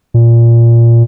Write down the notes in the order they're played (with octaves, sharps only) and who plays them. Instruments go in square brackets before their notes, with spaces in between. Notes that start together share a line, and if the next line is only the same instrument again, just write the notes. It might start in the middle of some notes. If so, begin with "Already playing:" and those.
[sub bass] A#2